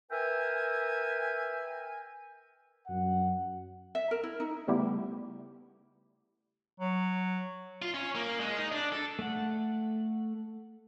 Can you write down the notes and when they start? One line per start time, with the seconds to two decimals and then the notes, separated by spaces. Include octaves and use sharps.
0.11 A#4 B4 E5 G5 G#5
2.87 F#2 F#5
3.95 E5
4.11 A#4
4.23 E4
4.40 D#4
4.68 C#3 G3 A3 B3 E4 G4
6.80 F#3
7.82 F4
7.94 C#4
8.15 A#3
8.40 G#3
8.58 D#4
8.72 D4
8.92 A4
9.19 A3 F#5